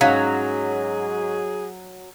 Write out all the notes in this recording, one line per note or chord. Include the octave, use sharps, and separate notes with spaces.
G#2 F#3 C#4 G#4 F5 B6